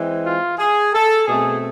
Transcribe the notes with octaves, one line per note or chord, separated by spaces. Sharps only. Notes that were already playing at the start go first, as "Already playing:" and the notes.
Already playing: E3 G#3 C4
F4
G#4
A4
B2 A3 C4 G#4